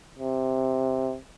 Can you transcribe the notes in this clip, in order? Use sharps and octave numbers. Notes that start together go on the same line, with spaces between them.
C3